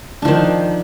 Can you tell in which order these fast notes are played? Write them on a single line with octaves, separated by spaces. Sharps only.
D4 F3 D#3